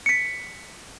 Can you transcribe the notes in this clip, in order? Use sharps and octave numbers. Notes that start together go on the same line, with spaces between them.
B6 C#7